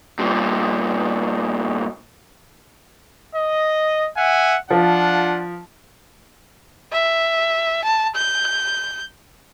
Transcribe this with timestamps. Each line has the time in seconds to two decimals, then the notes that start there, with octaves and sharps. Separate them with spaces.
0.19 G2 A#2
3.35 D#5
4.16 E5 F#5 G#5
4.70 F3 D4 F4 F#5
6.93 E5
7.84 A5
8.16 G6